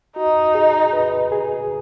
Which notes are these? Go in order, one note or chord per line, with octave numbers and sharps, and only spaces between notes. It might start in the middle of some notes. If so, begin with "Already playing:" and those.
D#4 F#4
G#4
B4
G#4